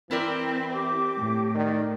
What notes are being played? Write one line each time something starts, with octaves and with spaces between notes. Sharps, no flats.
E3 C4 E4 A#4 D5 G5 B5
G4 D6
A2
D#3 D5